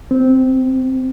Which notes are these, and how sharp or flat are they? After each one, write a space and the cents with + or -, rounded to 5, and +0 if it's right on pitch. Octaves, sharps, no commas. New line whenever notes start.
C4 -10